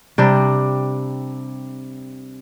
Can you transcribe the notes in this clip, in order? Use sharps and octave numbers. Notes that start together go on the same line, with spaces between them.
C3 G3 D4